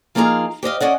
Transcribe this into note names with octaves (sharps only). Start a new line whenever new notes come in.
F3 A#3 D#4 F4 G#4 A#5
G4 C5 D#5 F5
C#4 D5 D#5 F#5